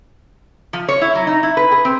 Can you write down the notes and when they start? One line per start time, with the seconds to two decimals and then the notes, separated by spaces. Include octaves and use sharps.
0.73 F3
0.88 C#5
1.01 E4
1.15 F#3
1.27 D#4
1.43 E4
1.57 B4
1.71 G#4
1.85 C4